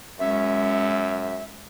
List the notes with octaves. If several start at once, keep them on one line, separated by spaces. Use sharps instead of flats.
F#2 G#3 C#4 E5